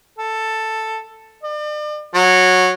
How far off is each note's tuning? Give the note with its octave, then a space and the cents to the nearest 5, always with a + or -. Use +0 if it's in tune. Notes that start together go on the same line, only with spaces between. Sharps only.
A4 +5
D5 +40
F#3 -10